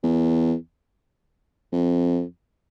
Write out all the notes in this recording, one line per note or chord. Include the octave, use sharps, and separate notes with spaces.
E2
F2